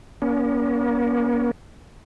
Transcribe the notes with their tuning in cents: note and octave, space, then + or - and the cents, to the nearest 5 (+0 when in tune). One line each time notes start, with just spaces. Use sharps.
A#3 +40 C#4 +40